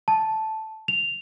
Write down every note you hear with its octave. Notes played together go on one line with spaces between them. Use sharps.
A5
F7